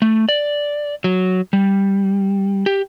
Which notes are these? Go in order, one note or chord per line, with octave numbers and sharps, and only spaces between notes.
A3
D5
F#3
G3
G4